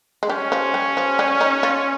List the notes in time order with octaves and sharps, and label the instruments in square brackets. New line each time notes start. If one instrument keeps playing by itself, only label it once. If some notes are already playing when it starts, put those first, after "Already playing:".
[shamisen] G#3
[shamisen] G3 [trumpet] C#4
[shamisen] F3
G3
F3
G3
D#4
F4